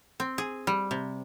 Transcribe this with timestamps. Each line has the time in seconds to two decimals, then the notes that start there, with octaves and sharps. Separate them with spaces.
0.20 C4
0.38 G#4
0.67 G3
0.91 C3